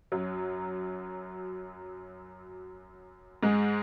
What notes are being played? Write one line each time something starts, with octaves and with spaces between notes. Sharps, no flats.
F#2 F#3
G#2 G#3